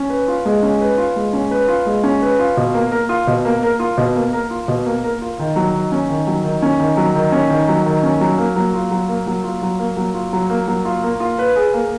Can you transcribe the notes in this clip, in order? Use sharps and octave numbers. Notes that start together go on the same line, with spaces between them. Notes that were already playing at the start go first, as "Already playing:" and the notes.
Already playing: C#4
B4
F4
G#3
C#4
B4
F4
G#3
C#4
B4
F4
G#3
C#4
B4
F4
B2
A#3
A#4
F4
B2
A#3
A#4
F4
B2
A#3
A#4
F4
B2
A#3
A#4
F4
D#3
F#3
D#3
C#4
D#3
F#3
D#3
C#4
D#3
F#3
D#3
C#4
D#3
F#3
D#3
C#4
F#3
A#3
F#3
F4
F#3
A#3
F#3
F4
F#3
A#3
F#3
F4
F#3
A#3
F#3
F4
A#3
F4
B4
G#4
A#3